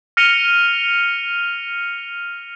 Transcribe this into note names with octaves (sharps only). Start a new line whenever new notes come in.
F6 A#6 C#7 D#7 F7 G7